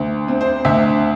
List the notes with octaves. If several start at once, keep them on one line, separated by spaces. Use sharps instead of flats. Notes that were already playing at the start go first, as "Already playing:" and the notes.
Already playing: D2
C4
C5
D2 E5